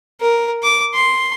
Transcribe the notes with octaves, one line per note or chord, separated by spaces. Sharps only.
A#4
D6
C6